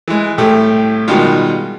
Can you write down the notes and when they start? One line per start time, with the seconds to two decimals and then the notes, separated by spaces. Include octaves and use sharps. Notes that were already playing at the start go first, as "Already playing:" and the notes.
0.08 E3 G#3
0.38 C2 A2 A3 G4
1.08 B2 D#3 G3 G#3 F4